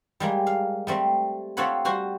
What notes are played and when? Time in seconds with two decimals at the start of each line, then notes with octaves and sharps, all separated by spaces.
0.20 G3 G#3 A#3
0.47 F5
0.87 G3 A3 C4
1.57 C4 F4 A4 C#5 F#5 B5
1.85 G3 F#4 C5